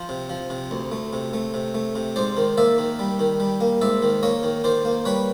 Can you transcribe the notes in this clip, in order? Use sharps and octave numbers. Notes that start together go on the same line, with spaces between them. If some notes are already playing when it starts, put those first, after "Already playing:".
Already playing: F3 C5
C3
F3
C3
D2
A3
C3
A3
C3
A3
C3
G#2 C5 D5
D#3
A#3 D5 E5
D#3
G3
D#3
G3
A#3
G#2 D5 E5
D#3
A#3 C#5 D#5
D#3
D#3 C5 D5
A#3
G3 B4 C#5